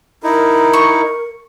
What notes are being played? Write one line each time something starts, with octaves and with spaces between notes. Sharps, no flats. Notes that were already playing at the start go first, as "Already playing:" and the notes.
D#4 E4 A#4
C#6